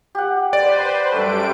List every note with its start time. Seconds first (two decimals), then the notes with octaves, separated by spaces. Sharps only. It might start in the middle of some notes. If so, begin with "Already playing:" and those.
0.15 G4 F#5
0.53 B4 C5 D5
1.12 F#2 G3 A3 D4 E5 D7